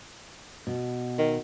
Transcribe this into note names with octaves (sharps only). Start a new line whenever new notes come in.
B2
D#3